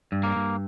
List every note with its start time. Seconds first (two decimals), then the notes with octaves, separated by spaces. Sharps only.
0.12 G2
0.23 A#3
0.36 G2